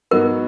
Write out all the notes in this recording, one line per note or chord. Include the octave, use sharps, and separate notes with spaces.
G#2 F#3 B3 D#4 F#4 A#4